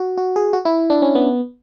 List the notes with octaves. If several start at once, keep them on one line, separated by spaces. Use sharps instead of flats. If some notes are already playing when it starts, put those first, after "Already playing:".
Already playing: F#4
F#4
G#4
F#4
E4
D4
C#4
B3